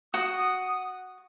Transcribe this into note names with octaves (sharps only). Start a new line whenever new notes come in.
F#4 F#5 D#6